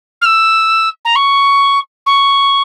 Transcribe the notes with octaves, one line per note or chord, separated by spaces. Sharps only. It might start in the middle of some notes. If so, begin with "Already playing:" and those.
F6
E6
A#5
C#6
C#6